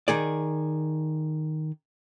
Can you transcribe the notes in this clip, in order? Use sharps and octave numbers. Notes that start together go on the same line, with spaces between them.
D#3 G#4 D5